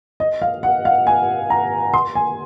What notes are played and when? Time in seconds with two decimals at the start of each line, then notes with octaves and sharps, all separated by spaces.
0.20 D#5
0.42 F5
0.63 F#5
0.85 F5
1.07 G#5
1.50 A#5
1.94 C6
2.15 G#5